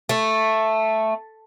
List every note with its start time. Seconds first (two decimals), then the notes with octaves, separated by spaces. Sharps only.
0.09 A3